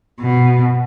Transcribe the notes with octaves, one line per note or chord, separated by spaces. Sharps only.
B2